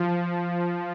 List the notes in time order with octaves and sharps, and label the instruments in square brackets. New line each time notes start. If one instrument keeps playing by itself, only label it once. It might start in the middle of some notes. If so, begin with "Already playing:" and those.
Already playing: [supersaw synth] F3